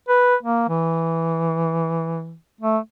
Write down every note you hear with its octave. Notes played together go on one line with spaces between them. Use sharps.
B4
A#3
E3
A3